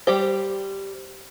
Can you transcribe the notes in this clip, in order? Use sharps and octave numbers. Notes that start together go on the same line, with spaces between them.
G3 G4 C5